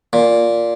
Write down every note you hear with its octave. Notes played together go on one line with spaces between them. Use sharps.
A#2